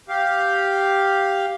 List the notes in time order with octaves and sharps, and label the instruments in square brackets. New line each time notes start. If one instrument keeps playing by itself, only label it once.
[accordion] G4 F5